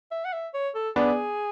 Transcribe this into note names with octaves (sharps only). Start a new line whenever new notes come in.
E5
F#5
E5
C#5
A4
B3 D4 G#4